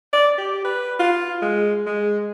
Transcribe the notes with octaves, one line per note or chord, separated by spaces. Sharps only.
D5
G4
B4
F4
G#3
G#3